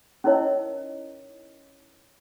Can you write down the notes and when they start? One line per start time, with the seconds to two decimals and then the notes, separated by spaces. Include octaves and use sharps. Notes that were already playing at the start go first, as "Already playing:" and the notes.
0.24 C#4 D#4 E4 A#4 C#5 D#5